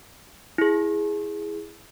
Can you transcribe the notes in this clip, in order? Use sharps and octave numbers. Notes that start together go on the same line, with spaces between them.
E4 G#4